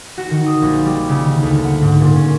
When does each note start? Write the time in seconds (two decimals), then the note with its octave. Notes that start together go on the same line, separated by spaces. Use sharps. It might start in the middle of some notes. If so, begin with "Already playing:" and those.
0.18 F#4
0.31 D#3
0.46 D#6
0.62 A#1
0.85 G3
1.09 C#3
1.29 D#3
1.43 D2
1.64 F#5
1.82 G#2
2.01 A#2
2.16 C#4